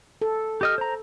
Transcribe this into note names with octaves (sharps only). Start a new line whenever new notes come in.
A4
G4 D#5 F6
C5 A#5